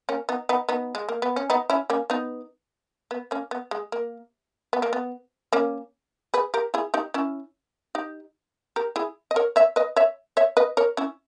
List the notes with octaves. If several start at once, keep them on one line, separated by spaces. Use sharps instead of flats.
A#3 C#4
B3 D#4
B3 D#4
B3 D#4
G#3
A#3
B3
C#4
B3 D#4
C#4 E4
A#3 C#4
B3 D#4
B3
A#3 C#4
B3
G#3
A#3
B3
A#3
B3
A#3 C#4
G#4 B4
G4 A#4
E4 G#4
D#4 G4
C#4 E4
D#4 G4
G4 A#4
E4 G#4
D#5
A#4 C#5
C#5 E5
B4 D#5
C#5 E5
C#5 E5
B4 D#5
A#4 C#5
C#4 E4